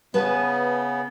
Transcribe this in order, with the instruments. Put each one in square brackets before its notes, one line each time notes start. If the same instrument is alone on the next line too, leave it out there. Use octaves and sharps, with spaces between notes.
[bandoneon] C#3 B3 [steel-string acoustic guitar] B4 G#5 A5